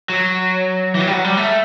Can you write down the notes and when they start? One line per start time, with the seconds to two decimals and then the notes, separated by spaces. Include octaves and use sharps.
0.10 F#3
0.95 E3
1.00 F#3
1.07 G3
1.12 F#3
1.24 G3
1.37 A3